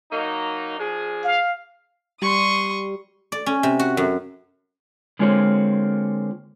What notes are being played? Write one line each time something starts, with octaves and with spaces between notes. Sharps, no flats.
F#3 A#3 D#4
F3 D4 G#4
F5
G3 C6 C#6 D#6
D5
C#4
C3
F#4
F#2
D3 G#3 A#3 C4 F4 C#5